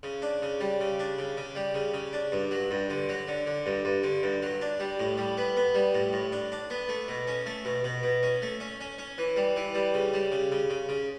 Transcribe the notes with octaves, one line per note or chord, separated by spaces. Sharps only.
C#3
D4
C#3
G3
C#3
D4
C#3
C#3
G3
C#3
C#3
D4
G2
F#3
G2
D3
F#3
D3
D3
G2
G2
D3
G2
F#3
D4
G3
A2
G3
B3
B3
G3
A2
A2
D4
D4
B3
A3
B2
C#4
A3
B2
B2
B2
C#4
A3
C#4
C#4
C#4
E3
G3
E3
G3
C#3
G3
C#3
C#3
C#3
C#3